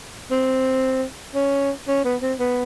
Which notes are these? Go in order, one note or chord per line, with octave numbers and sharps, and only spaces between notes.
C4
C#4
C#4
B3
C4
B3